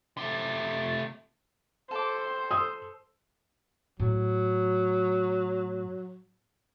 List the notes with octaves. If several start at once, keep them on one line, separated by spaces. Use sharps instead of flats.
C3 A3
A4 C5 D6
D#6 E6
A2 F#3